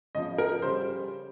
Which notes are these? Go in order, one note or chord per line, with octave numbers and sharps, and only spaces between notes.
C#3 F3 D#5
A#4
C#3 G3 C5